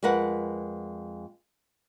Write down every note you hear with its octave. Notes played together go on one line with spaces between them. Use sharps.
F2 G#3 A#4 B4 F#5